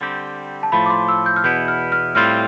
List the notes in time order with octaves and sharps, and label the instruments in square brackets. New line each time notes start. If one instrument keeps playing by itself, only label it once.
[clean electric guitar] D3 G3 C4 G4
[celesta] A5
[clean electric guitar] A2 F3 A3 [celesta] B5
[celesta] D6
C6
E6
G6
F6
[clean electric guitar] E2 B2 B3 E4 [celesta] G6
[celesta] F6
F6
[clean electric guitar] A2 G3 C4 F4 [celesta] F6